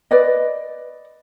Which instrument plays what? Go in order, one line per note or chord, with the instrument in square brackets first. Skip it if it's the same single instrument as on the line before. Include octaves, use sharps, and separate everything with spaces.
[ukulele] B4 D5 D#5